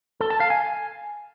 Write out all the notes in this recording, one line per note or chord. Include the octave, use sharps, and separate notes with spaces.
A4
A5
F5
G#5